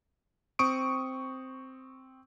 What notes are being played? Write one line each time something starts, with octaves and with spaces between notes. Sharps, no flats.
C4 C#6 D#6 D7